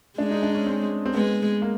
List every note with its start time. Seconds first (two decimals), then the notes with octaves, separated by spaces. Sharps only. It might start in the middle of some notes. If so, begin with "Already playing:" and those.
0.18 G#3 D4
0.31 D#4
0.43 D4
0.55 C#4
0.66 C4
1.06 C4
1.15 G#3 B3
1.62 A#3